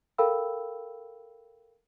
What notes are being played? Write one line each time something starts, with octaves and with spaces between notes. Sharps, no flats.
A4 A#4 F5 G5 B5 E6